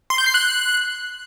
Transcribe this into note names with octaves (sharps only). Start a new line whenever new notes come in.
C6
G6
C7
F#6